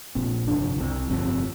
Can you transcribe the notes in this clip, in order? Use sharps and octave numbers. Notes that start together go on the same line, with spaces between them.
A#1 A#2 C4
G1 F2 C3 D4
C2 C3
G1 F2 C3 C4
C4